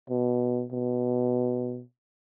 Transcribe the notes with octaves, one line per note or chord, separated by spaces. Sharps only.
B2
B2